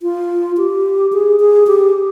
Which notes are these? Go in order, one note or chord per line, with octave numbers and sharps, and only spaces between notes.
F4
G4
G#4
G#4
G4